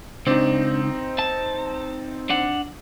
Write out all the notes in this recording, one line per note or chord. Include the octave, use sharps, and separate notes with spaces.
C#2 C4 D4 D#4
A5
D4 F#5